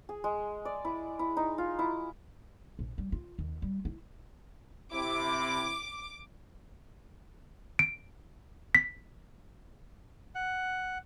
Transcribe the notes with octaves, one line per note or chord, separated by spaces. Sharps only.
G#4
G#3
D5
E4
E4
D#4
F4
E4
A#1
G3
F4
D#2
G3
E4
C3 E4 D6
D7
B6
F#5